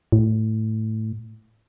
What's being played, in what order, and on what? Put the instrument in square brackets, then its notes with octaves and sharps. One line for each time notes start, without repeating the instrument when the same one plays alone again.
[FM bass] A2